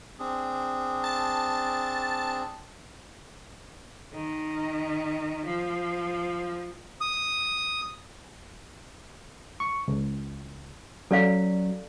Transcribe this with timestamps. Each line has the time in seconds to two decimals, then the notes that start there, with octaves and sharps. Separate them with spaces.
0.19 C4 D4 G#4
1.04 A5
4.14 D#3
5.45 F3
7.01 D#6
9.60 C#6
9.88 C#2
11.11 F#3 C#4 A4 D5 F5